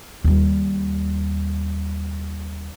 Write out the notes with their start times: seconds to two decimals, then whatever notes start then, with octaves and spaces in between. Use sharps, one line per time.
0.24 D#2 G3